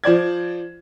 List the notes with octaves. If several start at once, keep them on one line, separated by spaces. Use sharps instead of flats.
F3 C5 D5 G#6